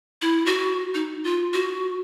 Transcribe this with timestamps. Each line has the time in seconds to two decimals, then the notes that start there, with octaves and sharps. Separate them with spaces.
0.22 E4
0.46 F#4
0.95 D#4
1.24 F4
1.54 F#4